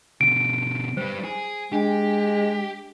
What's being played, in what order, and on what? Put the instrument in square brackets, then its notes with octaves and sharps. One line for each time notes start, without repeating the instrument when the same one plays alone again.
[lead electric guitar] B2 D3 [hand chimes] D7
[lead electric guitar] G3 B4 [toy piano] C5
[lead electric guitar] G#4 [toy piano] G#5
[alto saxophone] G#3 [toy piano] D4 G5 [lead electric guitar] G4